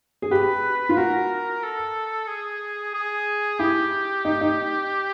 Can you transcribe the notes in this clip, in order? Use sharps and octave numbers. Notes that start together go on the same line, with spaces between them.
G#4
G4 B4
F4
F#4 A#4
A4
G#4
G#4
E4 G4
D#4
D#4